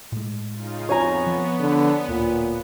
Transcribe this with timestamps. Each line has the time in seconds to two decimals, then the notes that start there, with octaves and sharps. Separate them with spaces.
0.12 A2 G#3
0.52 C#3 D#4 F4
0.89 F2 B3 C#5 G#5 A#5
1.27 F3
1.60 D3
2.09 D1 A#2